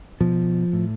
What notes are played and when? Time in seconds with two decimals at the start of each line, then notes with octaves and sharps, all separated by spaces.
0.21 B2 F3
0.73 A2